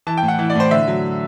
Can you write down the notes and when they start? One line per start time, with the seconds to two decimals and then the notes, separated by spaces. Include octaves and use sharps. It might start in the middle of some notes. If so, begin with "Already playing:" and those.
0.07 E3 A5
0.17 G5
0.23 A2
0.28 F#5
0.39 E3
0.50 D5
0.55 A2 C5
0.71 D3 E5
0.88 F#3